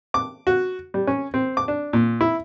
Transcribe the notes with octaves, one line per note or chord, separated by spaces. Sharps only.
D6
F#4
G3
C#4
C4
D6
D4
A#2
E4